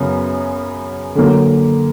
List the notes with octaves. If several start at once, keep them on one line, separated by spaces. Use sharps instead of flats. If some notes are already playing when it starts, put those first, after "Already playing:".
Already playing: F#2 C#3 F#3 B3
D3 F#3 A#3